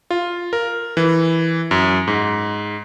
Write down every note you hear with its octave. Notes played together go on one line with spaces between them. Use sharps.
F4
A#4
E3
F#2
G#2